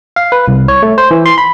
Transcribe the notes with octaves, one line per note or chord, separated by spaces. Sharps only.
F5
B4
C2
C#5
A3
C5
E3
C6
B5